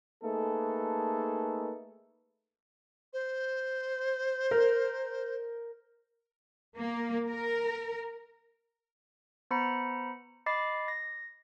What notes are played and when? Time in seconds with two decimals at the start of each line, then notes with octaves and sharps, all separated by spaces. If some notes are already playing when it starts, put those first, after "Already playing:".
0.23 A3 A#3 D#4 G#4 A4 B4
3.13 C5
4.51 A#4
6.78 A#3
7.29 A#4
9.51 B3 C5 A#5 B5 C#7
10.46 D#5 B5 D6 A6 C7
10.88 A#6